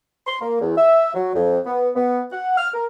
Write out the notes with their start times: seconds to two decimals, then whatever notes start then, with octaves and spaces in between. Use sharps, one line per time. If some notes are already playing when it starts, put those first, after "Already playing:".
0.27 C6
0.41 A#3
0.60 E2
0.77 E5
1.14 F#3
1.35 F2
1.66 B3
1.96 B3
2.32 F#5
2.57 F6
2.74 A#4